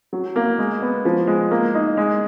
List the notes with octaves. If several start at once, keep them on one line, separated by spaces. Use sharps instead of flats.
F#3
A#3
G#3
B3
F3
G#3
A#3
D#4
G#3